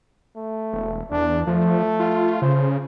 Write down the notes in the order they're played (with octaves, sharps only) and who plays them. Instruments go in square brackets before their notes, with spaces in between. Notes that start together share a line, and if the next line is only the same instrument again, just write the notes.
[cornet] A3
[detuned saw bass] E1
[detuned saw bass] E2 [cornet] D4
[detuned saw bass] F3 [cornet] A3
[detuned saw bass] F4
[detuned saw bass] C#3 [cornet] C5